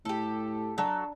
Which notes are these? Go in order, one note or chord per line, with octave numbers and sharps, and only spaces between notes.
A2 G4 A4
F#3 D4 A4 A5 A#5